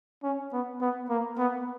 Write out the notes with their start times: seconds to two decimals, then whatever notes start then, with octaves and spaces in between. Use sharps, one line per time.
0.23 C#4
0.52 B3
0.81 B3
1.09 A#3
1.38 B3